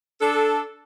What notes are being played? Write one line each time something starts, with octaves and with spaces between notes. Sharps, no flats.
D4 A4